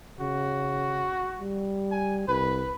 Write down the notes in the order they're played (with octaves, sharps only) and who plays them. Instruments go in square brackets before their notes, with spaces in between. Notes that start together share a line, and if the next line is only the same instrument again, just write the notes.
[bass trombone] C#3 [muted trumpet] F#4
[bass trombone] G3
[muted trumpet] G#5
[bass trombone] C2 [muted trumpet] B4